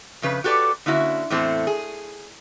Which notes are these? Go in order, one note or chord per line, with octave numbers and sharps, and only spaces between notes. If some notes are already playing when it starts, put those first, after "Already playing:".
F2 C#3 B4
F#4 G4 A4 B4 D5
D3 A#3 C#4 E4 F#4
E2 A2 C4 A4
G#4